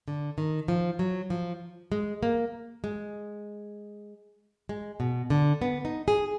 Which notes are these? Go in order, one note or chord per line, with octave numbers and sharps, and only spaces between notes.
D3
D#3
F3
F#3
F3
G#3
A#3
G#3
G#3
B2
D3
B3
D#4
G#4